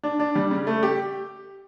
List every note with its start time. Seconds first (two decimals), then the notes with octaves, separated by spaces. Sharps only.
0.03 D4
0.20 D4
0.35 G3
0.51 C#3
0.67 A3
0.83 G4